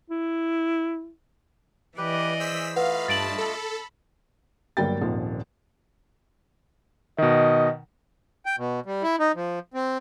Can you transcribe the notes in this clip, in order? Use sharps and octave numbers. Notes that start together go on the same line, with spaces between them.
E4
E3 G4 B4 D5 D#5
G#4 C5 E6 B6
A3 F4 B4 D#5 F5 F#5 B5
G2 A5 A6 D7 F#7
A4
G1 F#3 G3 A#3 G5 A6
D#1 G#1 A#2 F3
B2 D#3 D#5
G5
B2
G3
E4
D#4
F3
C4